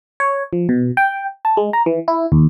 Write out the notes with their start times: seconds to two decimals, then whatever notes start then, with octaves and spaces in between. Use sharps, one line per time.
0.20 C#5
0.53 F3
0.69 B2
0.97 G5
1.45 A5
1.57 G#3
1.73 A#5
1.86 E3
2.08 E4
2.32 D#2